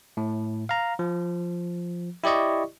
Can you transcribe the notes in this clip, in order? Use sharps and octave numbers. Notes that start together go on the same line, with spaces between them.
A2
F5 A#5
F3
E4 G4 D5 D#5 C#6